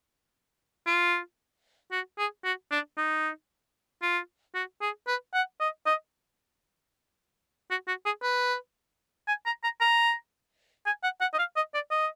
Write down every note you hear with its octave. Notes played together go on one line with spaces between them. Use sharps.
F4
F#4
G#4
F#4
D4
D#4
F4
F#4
G#4
B4
F#5
D#5
D#5
F#4
F#4
G#4
B4
G#5
A#5
A#5
A#5
G#5
F#5
F#5
D#5
F5
D#5
D5
D#5